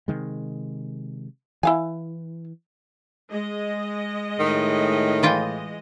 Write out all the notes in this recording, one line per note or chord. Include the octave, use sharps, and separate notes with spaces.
C3 D#3 G#3
E3 E4 F5 G#5
G#3 D#5
A2 D#3
E3 F4 G5